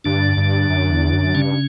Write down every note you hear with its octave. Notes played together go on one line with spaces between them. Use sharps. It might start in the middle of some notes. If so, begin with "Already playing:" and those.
G2 D3 D4
G2
F#2
E2
F#2
G2 C#3 C#4